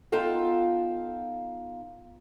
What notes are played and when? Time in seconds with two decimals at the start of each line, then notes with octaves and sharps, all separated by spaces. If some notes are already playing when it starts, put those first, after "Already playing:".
0.12 B3 D#4 F4 A4 F5 G5